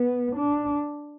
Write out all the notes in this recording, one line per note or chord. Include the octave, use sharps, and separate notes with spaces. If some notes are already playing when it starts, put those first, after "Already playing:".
Already playing: B3
D4